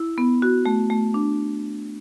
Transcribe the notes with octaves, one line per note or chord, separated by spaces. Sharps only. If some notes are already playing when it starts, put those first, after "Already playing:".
Already playing: E4
B3
F#4
A3
A3
D4